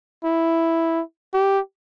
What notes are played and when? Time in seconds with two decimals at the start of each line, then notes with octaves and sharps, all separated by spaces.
0.25 E4
1.34 G4